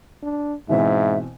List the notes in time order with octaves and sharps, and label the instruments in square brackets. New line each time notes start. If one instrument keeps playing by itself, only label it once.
[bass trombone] D4
[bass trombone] G#2 [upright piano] B2 E3 C4 [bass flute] E5